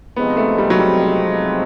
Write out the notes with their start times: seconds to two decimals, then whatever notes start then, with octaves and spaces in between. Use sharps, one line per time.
0.16 C3 F3 G#3 B3 C4 D#4
0.37 A3
0.58 G3
0.70 F#3
0.79 G3